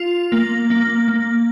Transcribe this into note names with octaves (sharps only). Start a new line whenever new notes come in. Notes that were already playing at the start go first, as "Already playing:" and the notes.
Already playing: F4
A#3
A#3
A#3